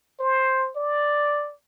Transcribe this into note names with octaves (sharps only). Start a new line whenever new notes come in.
C5
D5